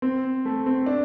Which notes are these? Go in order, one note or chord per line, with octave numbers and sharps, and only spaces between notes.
C4
A3
C4
D4